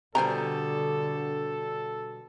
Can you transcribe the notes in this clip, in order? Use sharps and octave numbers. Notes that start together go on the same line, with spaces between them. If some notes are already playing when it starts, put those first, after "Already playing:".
B2 D3 G3 A4 C5 G#5 A#5